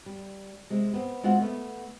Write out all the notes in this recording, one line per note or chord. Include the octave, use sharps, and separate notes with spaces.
G3
C3 G#3
B3 C4
G#3 C4 F4 F#4 F#5
A3 B3